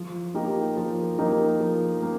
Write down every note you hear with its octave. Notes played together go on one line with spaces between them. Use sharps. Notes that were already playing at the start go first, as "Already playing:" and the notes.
Already playing: F3
A#3 D#4 G4 A#4
F3
A#3 D#4 G4 A#4
F3
A#3